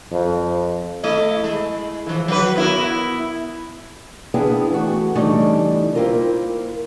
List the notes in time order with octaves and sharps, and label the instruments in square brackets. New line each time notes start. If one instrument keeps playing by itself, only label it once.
[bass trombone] F2
[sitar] A3 E4 D#5
G#3
E3 F3
F#3 F#4 B4
B3 E4 A#4
[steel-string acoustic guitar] B3 C4 D4 E4 G#4 F5
E3 A3 F#4
C#3 E3 G3 A3 D4 D#4
A#3 C4 E4 F4 A#4